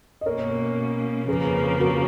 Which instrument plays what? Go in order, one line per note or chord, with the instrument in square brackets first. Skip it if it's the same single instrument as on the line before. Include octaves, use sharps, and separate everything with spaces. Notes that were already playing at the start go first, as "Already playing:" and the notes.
[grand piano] D#5
[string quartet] B2 A#3 C#4 [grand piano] A#4 C#5
[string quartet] F2 C#3 F3 A#3 [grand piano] G#4 B4
[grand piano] F#4 A#4